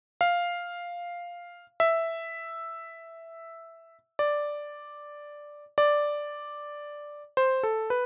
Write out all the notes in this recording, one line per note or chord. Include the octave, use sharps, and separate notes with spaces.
F5
E5
D5
D5
C5
A4
B4